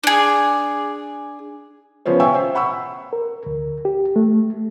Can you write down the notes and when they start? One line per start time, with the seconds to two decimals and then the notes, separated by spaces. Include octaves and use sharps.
0.04 D4 G#4
2.05 C#3 F3 B3 C#4 C5
2.20 E5 F5 G5 G#5 C#6 E6
2.34 C5
2.55 F#5 B5 C#6 E6
3.13 A#4
3.46 D2
3.85 G4
4.16 A3